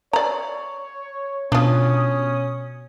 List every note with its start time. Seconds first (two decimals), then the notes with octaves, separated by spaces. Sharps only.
0.13 C#5 D5 A#5
1.52 B2 C#4 D4 F4 D#6